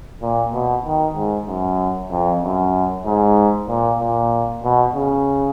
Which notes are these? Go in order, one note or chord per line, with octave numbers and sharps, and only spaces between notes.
A#2
B2
D#3
G#2
F#2
F2
F#2
G#2
A#2
A#2
B2
C#3